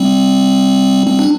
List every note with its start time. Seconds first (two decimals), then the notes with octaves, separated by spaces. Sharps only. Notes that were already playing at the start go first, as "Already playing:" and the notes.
Already playing: G3 C4
1.07 G3 C4
1.19 D4